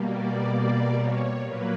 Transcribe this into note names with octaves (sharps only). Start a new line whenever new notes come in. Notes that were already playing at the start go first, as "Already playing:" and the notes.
Already playing: B2 G3 A#3
D5
D5
C#5
A#2 F#3 A#3 B4